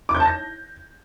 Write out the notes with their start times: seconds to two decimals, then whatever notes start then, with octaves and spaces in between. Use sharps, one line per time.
0.09 D6
0.15 G6
0.20 A5
0.26 A#6